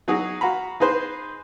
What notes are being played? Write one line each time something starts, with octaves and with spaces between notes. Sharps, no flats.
F#3 D#4 F#4 G#4
F#4 F5 A#5 B5
D#4 G#4 B4 C5